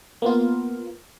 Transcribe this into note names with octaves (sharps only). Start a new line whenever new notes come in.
A#3 B3 F4